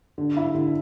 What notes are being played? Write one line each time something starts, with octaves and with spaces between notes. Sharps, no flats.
D3
E4
D3